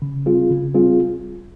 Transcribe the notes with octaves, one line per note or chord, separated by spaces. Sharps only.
C#3
G3 C4 F4 G#4
C#3
G3 C4 F4 G#4